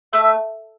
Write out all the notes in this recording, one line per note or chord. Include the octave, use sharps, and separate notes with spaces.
A3 E5
E5